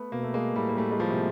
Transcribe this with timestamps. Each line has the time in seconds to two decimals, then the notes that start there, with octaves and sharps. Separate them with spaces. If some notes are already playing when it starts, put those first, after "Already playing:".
Already playing: A3 B3
0.12 B2 A#3
0.23 A3
0.34 G#3 A#3
0.56 A2 G3 A3
0.69 A#3
0.77 G3 A3
0.92 G#3
0.99 F3 G3
1.10 C3